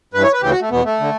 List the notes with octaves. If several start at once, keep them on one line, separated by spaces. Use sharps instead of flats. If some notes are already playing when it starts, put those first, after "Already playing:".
G2 E3 B4
C#5
B4
D2 C#3 E3 G4
F#4
A3
E2 B2 B3
A3
D3